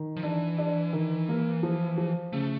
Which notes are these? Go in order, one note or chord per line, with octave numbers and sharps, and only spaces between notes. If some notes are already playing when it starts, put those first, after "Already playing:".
Already playing: D#3
F3
E3 D4
D4
D#3
A#3
F3
F3
C#3 A3